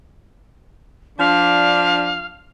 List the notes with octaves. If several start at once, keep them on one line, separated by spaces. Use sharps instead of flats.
F3 D4 F5